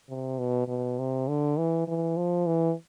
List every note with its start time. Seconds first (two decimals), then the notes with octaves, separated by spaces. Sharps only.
0.09 C3
0.39 B2
0.68 B2
0.99 C3
1.28 D3
1.58 E3
1.87 E3
2.17 F3
2.47 E3